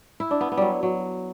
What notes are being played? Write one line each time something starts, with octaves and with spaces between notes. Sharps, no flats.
E4
D4
B3
B3
F#3 G3
F#3